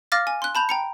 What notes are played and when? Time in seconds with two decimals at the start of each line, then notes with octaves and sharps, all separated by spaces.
0.12 F5 D6 F6 A6 A#6
0.27 G#5
0.42 C6 F#6
0.55 A5 B5 G6 F7
0.69 G5 A#5 C#7